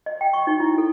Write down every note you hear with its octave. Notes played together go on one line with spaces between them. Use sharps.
D#5
G5
C#6
D#4
E4
A4